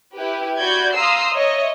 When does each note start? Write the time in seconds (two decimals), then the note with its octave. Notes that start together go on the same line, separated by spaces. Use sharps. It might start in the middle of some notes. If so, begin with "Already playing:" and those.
0.16 E4 G4 B4
0.60 F#4 D5 B5 G6 G#6
0.95 F5 A#5 C6 D#6 E6 C7
1.34 C#5 D#5 E5